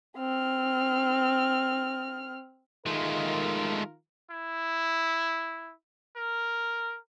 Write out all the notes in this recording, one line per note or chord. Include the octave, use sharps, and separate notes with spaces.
C4 F6
D#3 G#3 A3 F4 A#4
E4
A#4